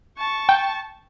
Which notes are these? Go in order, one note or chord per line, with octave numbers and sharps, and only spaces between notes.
A5 C#6
G5